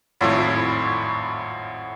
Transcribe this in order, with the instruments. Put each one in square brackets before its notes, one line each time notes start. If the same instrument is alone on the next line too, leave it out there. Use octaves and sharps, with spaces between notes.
[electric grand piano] G#1 F2 A2 [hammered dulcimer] F#3 E4 F4